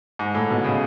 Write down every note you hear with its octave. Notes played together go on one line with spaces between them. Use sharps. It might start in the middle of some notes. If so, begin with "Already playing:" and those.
G#2
A2
B2
C#3